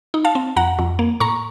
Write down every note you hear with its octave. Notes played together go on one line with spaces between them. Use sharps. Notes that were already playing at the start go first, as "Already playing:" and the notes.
D#4
F5 A5
C4
F2 F#5 A#5
F2
A#3
A2 A#5 C#6